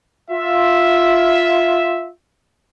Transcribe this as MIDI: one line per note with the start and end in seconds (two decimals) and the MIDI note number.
0.31 2.10 65
0.31 2.10 76